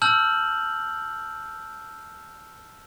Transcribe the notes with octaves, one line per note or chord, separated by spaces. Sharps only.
A5 E6 F6 G6 F#7